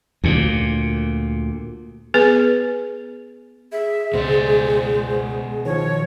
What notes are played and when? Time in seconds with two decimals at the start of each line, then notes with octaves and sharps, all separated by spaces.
0.24 D2 A#2
2.14 B3 G#4 B4
3.72 G#4 E5
4.13 C#2 B2 G#3 C5 D5
5.65 D#3 F3 C#5